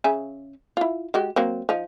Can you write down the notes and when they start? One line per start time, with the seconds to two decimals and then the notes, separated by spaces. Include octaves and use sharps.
0.04 C#3 E5 G#5
0.77 E4 F4
1.14 G#3 F#4 G4
1.36 F#3 A#3 C4
1.69 F3 D#4